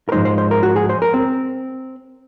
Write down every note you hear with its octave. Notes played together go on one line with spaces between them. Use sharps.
A#4
G#2 F3 G#3 D#4 C5
C5
C5
A#4
F#4
G#4
C5
A#4
C4